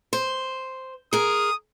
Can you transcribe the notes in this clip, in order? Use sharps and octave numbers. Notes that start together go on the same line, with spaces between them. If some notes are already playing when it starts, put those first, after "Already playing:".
C5
G#4 A#4 D#6